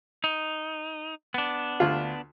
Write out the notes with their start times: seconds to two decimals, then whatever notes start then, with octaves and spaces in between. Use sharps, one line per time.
0.24 D#4
1.34 B3 D4
1.80 D2 F4